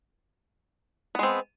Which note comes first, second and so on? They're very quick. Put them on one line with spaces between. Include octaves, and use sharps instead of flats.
B3 G#3 C4